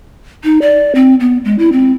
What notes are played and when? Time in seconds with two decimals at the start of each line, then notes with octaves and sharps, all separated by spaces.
0.44 D#4
0.62 D5
0.95 C4
1.20 B3
1.45 G#3
1.59 E4
1.72 C4